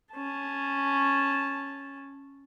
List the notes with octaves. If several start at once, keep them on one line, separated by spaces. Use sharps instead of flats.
C#4 A5